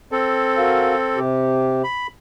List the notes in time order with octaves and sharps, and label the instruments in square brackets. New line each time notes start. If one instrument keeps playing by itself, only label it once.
[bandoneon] C4 A4
[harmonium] F#4 A#4 F5
C3 G4
[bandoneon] B5